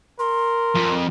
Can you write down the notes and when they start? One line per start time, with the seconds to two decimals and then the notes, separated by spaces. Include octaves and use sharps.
0.19 A#4 C6
0.75 F2